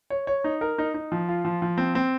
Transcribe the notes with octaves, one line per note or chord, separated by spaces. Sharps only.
C#5
C#5
D#4
A#4
D#4
D#4
F3
F4
F3
F3
C4
C4